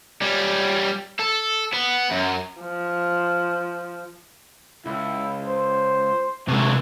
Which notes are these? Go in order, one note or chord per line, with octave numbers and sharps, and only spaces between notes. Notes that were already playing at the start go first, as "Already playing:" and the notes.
G3 C#4
A4
B3
F#2
F3
C#2 E4
C5
C3 E3 G#3 A3 F#4